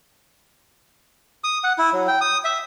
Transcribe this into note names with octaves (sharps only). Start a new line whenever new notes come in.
D#6
F#5
E4
F#3
G5
D#6
E5